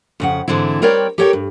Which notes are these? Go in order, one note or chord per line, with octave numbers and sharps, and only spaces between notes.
F2 C#3 F#5
G#2 D3 E3 C4 E4
G3 C4 A#4 C#5 D5 G5
G4 A4 A#4 C#5 E5 G5
G2